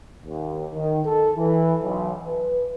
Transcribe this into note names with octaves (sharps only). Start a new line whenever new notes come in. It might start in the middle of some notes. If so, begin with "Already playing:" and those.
D#2
D#3
A4
E3
B1
B4